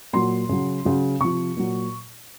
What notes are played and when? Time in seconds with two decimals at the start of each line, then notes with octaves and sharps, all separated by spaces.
0.13 A#2 F#3 C6
0.49 C#3 F#3
0.85 C#3 F#3
1.21 C3 F3 C#6
1.57 A#2 F#3